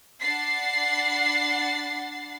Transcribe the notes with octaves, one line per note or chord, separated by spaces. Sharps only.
D4 F#5 B5 A6 C7